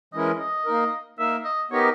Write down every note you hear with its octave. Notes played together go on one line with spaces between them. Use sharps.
E3 G#3 C#4 E4 A#4 D#5
D#5
A#3 D#4 A#4
A#3 D#4 A#4 E5
D#5
B3 D#4 G4 A#4 C#5 D#5